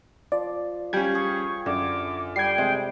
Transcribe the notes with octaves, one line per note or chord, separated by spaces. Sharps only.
F3 D5
G3 C#4 A4 F5 G5 G#6
G#4 C#6
F#2 D3 D6
G3 G5 G#6 C7
C3 G#3